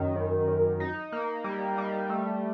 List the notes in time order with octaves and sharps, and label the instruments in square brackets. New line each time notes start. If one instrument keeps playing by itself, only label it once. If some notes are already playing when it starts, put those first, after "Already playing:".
Already playing: [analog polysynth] F#2 D#3
F#2
F#2
D#4
A#3
G3
G3
A3